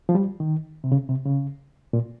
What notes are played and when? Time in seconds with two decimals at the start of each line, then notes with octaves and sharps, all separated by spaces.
0.09 F3
0.15 G3
0.40 D#3
0.84 C3
0.92 C#3
1.09 C3
1.25 C#3
1.93 A#2